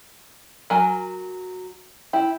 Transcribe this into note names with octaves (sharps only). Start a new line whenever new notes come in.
F#3 A#4 G#5
E4 G5